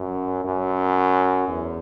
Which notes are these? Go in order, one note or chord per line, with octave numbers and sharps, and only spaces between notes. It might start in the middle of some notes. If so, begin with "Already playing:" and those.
Already playing: F#2
F#2
E2